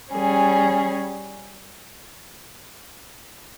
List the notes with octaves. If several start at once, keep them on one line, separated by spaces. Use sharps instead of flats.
G3 C#4 G#4